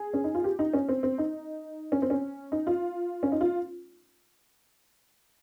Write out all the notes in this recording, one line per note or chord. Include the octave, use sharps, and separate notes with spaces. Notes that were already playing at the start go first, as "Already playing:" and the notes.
Already playing: G#4
C#4
D#4
F4
G4
D#4
C#4
C4
C4
D#4
C#4
C4
C#4
D#4
F4
C#4
D#4
F4